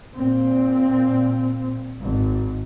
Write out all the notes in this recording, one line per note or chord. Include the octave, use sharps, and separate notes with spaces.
A#2 C4
G#1